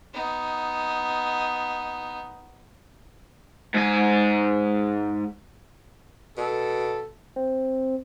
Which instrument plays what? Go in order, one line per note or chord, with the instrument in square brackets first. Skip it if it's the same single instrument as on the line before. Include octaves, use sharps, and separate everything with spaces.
[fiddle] B3 D#4
[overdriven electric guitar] G#2 G#5
[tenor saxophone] B2 [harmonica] A4
[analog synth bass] C4